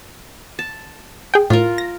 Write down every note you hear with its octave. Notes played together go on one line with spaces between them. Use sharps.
A5
G#4 G5
A2 F4 A#4
A#6